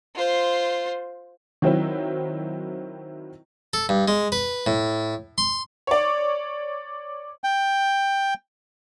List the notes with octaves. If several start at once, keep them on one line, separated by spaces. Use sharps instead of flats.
F4 C5
D#3 F#3 C4 E4
A4
G2
G#3
B4
A2
C6
C#5 D5
G5